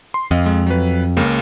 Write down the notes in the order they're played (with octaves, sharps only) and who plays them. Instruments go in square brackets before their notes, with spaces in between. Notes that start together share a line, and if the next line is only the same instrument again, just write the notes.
[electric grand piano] C6
[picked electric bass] F2 [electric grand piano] D#5 F5
[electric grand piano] G#3
F#3 B4
C#2 C#3 A#3